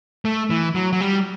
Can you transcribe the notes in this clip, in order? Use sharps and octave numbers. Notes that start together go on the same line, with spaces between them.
A3
E3
F#3
F#3
G3